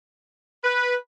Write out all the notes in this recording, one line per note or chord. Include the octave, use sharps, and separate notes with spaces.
B4